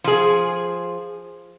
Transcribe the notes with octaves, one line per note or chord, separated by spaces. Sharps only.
F3 G#4